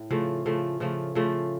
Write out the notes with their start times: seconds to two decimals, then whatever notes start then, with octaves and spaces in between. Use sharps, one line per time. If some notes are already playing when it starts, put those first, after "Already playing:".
Already playing: A2
0.10 C#3 F3 A3
0.46 C#3 F3 A3
0.80 C#3 F3 A3
1.15 C#3 F3 A3